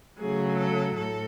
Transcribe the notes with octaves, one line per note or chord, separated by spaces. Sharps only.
C#3 F#3 A3 G#4
A4
A2 A4